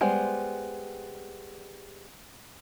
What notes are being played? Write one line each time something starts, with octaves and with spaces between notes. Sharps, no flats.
G3 G#3 B3 C5